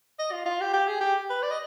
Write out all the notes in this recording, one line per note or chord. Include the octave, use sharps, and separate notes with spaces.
D#5
F4
F4
G4
G4
G#4
G4
B4
D5
D#5